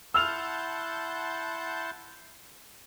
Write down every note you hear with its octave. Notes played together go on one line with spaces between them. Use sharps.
E4 F#5 A5 C6 E6 F6 G6 F7